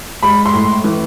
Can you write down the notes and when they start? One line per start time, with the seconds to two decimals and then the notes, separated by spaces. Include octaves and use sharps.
0.23 G#3 B5
0.45 C6
0.53 A2
0.84 E3